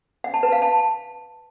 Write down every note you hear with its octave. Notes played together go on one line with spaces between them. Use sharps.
F#5
A5
B4
F5
A5